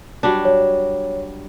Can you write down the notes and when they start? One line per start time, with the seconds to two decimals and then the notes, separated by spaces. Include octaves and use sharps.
0.23 F#3 G3 D4
0.45 C#5